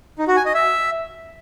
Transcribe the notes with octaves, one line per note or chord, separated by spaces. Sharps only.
D#4
F#4
G#5
D#5
E5